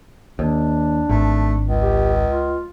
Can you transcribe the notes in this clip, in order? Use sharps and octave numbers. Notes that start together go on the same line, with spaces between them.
D#2 D4
G#1 A3
C#2
G4
F4